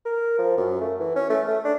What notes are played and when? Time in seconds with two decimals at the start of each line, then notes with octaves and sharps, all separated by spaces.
0.05 A#4
0.38 F3
0.57 F#2
0.81 A3
1.00 E3
1.16 C#4
1.30 A3
1.48 A3
1.65 D4